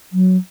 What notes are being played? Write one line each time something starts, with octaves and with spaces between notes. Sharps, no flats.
F#3